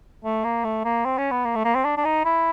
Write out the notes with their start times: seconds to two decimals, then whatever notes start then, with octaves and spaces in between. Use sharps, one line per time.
0.24 A3
0.44 A#3
0.64 A3
0.85 A#3
1.05 C4
1.18 C#4
1.31 B3
1.45 A#3
1.55 A3
1.65 A#3
1.75 C4
1.85 D4
1.97 D4
2.05 D#4
2.25 E4